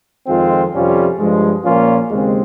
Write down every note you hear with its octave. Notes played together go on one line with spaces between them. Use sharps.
F2 D#3 G#3 C4 F4
F2 C3 G3 C#4 F4
G2 F3 G#3
A#2 F3 A#3 C#4 F4
D#2 C#3 G#3 C4